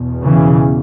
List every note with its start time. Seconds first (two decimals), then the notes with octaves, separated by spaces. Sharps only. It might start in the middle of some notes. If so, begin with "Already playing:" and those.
Already playing: E2 B2
0.25 C#3 E3